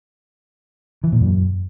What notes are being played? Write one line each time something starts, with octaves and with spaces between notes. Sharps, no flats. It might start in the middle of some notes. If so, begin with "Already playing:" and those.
E3
A#2
F#2